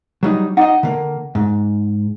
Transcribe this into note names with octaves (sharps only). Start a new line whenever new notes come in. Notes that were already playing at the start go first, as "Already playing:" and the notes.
F#3 G3 D#4
D#4 D#5 F#5
D3 A#3
G#2